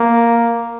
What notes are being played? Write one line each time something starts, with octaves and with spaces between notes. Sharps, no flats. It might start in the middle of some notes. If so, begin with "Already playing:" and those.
Already playing: A#3